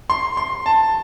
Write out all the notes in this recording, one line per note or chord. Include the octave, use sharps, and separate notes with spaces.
C6
C6
A5